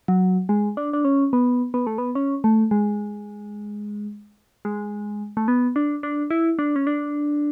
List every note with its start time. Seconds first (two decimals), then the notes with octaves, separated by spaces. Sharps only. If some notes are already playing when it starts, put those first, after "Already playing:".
0.08 F#3
0.49 G#3
0.77 D4
0.93 D4
1.05 C#4
1.33 B3
1.74 B3
1.87 A3
1.98 B3
2.15 C#4
2.44 A3
2.71 G#3
4.65 G#3
5.37 A3
5.48 B3
5.76 D4
6.03 D4
6.31 E4
6.59 D4
6.76 C#4
6.87 D4